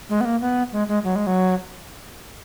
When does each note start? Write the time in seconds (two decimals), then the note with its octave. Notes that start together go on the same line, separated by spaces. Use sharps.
0.09 G#3
0.21 B3
0.25 A#3
0.41 B3
0.72 G#3
0.88 G#3
1.04 F#3
1.16 G#3
1.27 F#3